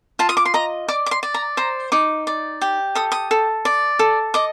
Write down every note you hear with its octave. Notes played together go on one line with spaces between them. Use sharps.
F4 A5
D#6
D6
C6
D#5 A#5
D5 D6
D6
C6
D5
A#5
C5 A#5
D#4 D6
D5
G4
A4 D#6
D#6
A4
D5
A4
D#5 D6